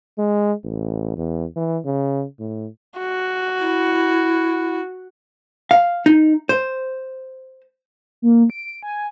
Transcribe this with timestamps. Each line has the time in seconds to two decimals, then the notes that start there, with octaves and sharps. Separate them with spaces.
0.18 G#3
0.64 A1
1.17 E2
1.56 E3
1.85 C#3
2.39 A2
2.99 F#4
3.59 E4
5.71 F5
6.06 D#4
6.49 C5
8.22 A#3
8.50 D7
8.83 G#5